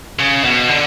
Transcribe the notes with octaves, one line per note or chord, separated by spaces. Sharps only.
C#3
B2
D3